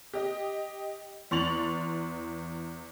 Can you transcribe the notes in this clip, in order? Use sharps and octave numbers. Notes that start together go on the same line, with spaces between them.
G4 D#5
E2 C6 C#6 A6 F7 F#7